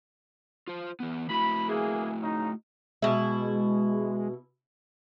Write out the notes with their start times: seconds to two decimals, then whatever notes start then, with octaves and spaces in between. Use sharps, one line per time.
0.68 F4 C5
1.00 E3 B3
1.29 A3 E4 F#4 B5
1.68 E3 A#3 G#4
2.21 C#3 D#4
3.02 B2 G#3 E4